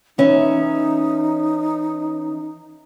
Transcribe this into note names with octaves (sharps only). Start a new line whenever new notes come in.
E3 C#4 D#4 E5